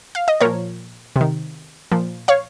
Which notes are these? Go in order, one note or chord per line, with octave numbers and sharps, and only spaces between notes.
F5
D#5
A#2 F3 A#4 C#5
C3
D#3
A#2 F3
C#5 F5